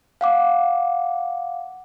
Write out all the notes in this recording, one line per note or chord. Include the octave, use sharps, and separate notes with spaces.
F5 F#5 D6